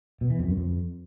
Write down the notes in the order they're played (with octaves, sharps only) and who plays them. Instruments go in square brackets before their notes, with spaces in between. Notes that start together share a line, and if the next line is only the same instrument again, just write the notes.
[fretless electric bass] B2
E3
F2
F#2
F2